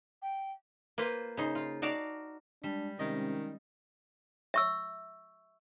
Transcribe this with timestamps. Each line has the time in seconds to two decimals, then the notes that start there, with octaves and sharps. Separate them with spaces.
0.22 G5
0.98 A#3 F4 B4 C5
1.37 C#3 D#4 C5
1.55 F4
1.82 D#4 F#4 D5 F5 A5
2.64 G3 G#3 D4
2.99 C3 D#3 G#3 C#4 D#5
4.54 E5 C#6 E6